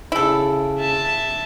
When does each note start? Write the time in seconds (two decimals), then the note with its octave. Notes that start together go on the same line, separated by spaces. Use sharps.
0.12 C#3 E4 A4
0.79 E5 A5